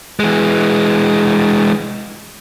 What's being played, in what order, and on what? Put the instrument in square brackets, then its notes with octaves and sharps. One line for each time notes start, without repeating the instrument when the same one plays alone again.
[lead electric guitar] E3 G#3